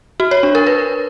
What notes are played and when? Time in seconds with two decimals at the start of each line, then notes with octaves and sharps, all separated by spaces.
0.20 F#4
0.31 C#5
0.43 D4
0.55 A#4
0.67 B4